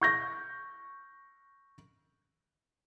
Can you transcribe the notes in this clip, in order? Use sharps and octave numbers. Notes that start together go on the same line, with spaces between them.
C#6 G6 A#6